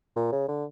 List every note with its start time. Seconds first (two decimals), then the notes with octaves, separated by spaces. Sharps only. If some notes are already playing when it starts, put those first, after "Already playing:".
0.16 A#2
0.32 C#3
0.48 D3